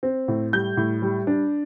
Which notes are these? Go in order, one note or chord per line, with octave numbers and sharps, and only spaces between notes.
C4
A2
G3 G6
A2
G3
D4